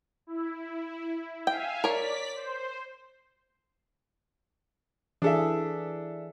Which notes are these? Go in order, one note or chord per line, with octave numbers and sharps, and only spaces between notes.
E4
E5 F5 G5 G#5
A#4 C#5 D5 B6
C5
E3 D4 G#4 A4 E5